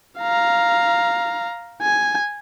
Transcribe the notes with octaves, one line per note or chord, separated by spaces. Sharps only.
F5 A#5
G#5